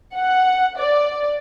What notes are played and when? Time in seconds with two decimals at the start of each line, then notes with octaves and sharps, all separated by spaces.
0.15 F#5
0.78 D5